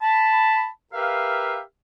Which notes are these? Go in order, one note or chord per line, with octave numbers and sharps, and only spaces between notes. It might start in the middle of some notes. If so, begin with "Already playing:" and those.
A5 B5
G4 A#4 B4 E5 F5